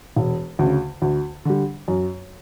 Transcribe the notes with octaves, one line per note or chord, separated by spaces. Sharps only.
E1
D2 C#3
D2
D3 G3
F#2